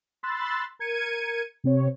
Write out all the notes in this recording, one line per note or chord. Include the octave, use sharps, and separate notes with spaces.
B5 C6 E6 F#6 A6
A#4 G#6 C#7 D#7
C3 C4 C#5